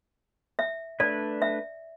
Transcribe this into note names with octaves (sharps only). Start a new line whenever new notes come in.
E5
A3 D4 B4 D5
E5